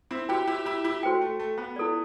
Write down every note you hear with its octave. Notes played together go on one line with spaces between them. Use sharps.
C4 E4
E4 F#4 G4 C5 G5
E4 G4
E4 G4
E4 G4
A3 F#4 C5 G5
A3
A3
B3
E4 A4 D5